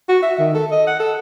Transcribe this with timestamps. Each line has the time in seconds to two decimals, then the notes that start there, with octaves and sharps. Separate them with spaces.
0.09 F#4
0.23 E5
0.39 D#3
0.55 A4
0.71 D#5
0.87 F#5
1.00 A4